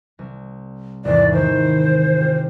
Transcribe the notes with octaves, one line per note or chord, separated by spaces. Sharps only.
C2
G#1 E2 C3 D5
D#3 C5
F4 G4